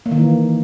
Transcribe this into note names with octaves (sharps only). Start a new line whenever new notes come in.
A#3
D#3
E3